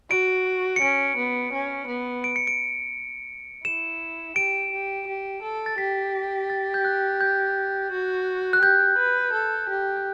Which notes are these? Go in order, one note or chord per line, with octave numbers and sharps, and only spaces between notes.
F#4 D7
C#7
C#4 D7
B3
C#4
B3
D7
C#7
D7
E4 E7
G4 D7
G4
G4
A4
A6
G4 B6
A6
G6
F#6
G6
F#4
F#6
G4 G6
B4
A4
G4
G6